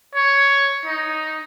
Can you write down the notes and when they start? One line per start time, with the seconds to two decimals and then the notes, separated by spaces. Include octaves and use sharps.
0.15 C#5
0.86 D#4